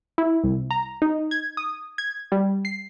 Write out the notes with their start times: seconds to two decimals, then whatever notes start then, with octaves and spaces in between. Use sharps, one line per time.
0.18 E4
0.44 C2
0.71 A#5
1.02 D#4
1.31 G#6
1.57 D#6
1.98 G#6
2.32 G3
2.65 C7